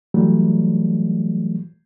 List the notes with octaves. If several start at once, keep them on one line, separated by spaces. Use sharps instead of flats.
E3 F#3 G3 A3